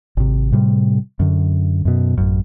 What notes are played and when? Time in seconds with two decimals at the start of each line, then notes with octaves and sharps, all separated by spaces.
0.17 G#1 C3
0.52 A2 C3 G3
1.19 F#2 D3
1.85 F#2 B2
2.18 A1 F#2